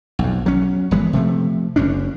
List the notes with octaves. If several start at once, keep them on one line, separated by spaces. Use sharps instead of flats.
B1 F2
F#3 C#4
G1 E3 G#3 B3
C3 F3 A3
F#1 F#2 C#4 D4